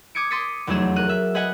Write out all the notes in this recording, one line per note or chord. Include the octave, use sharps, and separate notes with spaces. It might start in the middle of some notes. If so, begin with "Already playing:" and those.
D6 D#6 G#6 C#7 D7
C6 D6 D#6 A6 B6 C#7
F1 E2 F#3 A3 G#4 E7
A#4 F#6 D#7
E5
G#4 B4 D#5 F#5 G#5